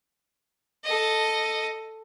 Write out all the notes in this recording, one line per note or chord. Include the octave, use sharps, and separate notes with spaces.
A4 D#5